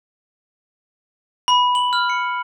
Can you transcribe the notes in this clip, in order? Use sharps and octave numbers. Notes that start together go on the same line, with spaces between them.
B5
F#7
F6
C#7